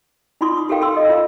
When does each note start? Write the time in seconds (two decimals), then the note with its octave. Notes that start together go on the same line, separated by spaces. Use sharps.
0.41 D#4 F4 C6 C#6 D#6
0.57 D#6
0.69 G4 A4 A#4 F5 G5
0.81 A4 C6 E6
0.94 A4 D#5
1.09 F4 F5